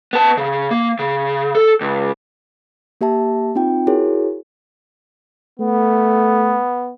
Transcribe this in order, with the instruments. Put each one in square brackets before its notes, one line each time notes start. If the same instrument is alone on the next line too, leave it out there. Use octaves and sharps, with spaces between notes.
[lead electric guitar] B3 A5
C#3
A#3
C#3
A4
C#2
[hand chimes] A#3 G4 E5 A5
C4 D#4 F4 G5
E4 F#4 G#4 A#4 C#5
[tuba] A3 [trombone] B3